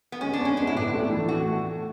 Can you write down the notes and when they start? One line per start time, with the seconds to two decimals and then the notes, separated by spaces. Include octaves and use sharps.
0.12 B3
0.21 G#3 C#4
0.33 D4
0.39 B3
0.45 C#4
0.57 G#3 D4
0.67 E4
0.75 A2 D4
0.93 A3
1.11 E3
1.28 A3 F#4